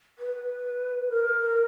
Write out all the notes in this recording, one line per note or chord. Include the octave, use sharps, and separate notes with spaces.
B4
A#4